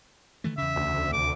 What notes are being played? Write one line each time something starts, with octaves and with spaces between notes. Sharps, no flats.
D#3 E3 A3
E2 C#3 E5
D2
D#2 C3 D6